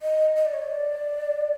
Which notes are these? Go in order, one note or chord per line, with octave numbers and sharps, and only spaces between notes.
D#5
D#5
D5
C#5
D5